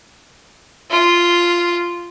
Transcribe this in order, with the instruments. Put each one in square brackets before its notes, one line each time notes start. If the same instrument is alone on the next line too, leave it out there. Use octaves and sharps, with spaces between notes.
[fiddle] F4